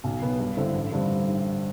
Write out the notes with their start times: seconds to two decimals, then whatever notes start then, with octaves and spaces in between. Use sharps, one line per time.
0.04 B1
0.22 B2 F#3 B3
0.40 G2
0.57 D3 A3 C4 E4
0.75 A1
0.92 G2 D3 G3 C4